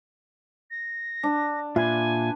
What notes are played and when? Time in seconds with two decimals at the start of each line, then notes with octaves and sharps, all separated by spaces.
0.71 A#6
1.23 D4
1.76 A#2 F4 B4 E5 G#5